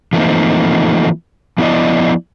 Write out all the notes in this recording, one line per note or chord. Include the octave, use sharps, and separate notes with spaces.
E3 F3 A3 A#3 C4 D#4
F3 B3 E4 G4 D5 D#5